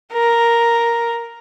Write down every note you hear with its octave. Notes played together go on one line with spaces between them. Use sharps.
A#4